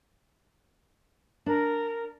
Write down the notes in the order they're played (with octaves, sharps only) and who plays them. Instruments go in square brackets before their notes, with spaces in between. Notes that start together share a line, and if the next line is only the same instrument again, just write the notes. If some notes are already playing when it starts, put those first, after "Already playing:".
[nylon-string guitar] D4 [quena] A#4